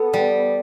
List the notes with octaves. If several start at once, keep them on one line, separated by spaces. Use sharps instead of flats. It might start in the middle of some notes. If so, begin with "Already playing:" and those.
Already playing: B3 A4
G3